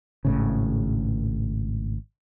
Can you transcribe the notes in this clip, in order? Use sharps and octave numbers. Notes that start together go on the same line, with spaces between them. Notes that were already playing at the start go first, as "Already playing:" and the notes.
G#1 A2 C#3